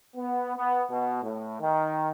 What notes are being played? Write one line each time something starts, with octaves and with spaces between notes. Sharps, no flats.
B3
B3
B2
A2
D#3